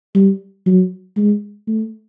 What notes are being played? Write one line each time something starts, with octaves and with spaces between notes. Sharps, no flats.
G3
F#3
G#3
A3